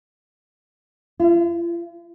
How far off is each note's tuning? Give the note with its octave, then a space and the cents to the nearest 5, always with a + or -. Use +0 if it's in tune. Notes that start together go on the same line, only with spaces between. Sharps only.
F4 -45